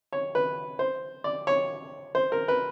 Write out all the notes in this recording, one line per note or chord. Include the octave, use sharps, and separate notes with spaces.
C#5
B4
C5
D5
C#5
C5
A#4
B4